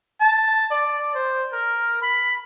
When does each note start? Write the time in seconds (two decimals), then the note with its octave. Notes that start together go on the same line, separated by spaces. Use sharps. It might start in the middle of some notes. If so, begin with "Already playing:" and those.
0.21 A5
0.71 D5
1.14 C5
1.53 A#4
2.02 B5